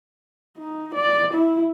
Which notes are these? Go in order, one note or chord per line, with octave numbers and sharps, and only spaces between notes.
D#4
D5
E4